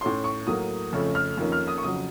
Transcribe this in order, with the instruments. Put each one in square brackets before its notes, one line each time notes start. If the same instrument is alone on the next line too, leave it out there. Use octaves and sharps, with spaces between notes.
[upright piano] A2 A3 C#4 C6
C#6
A2 F#3 A#3 D#6
F2 C#3 A3 C#4
F6
F2 D#3 A#3 C#4
F6
D#6
C#6
F2 C#3 F#3 D#6